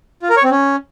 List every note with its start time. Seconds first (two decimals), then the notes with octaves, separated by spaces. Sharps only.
0.22 F4
0.30 A#4
0.37 C#5
0.44 C4
0.51 C#4